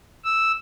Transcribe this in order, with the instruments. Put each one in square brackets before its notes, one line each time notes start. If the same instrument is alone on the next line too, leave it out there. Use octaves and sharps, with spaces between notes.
[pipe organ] E6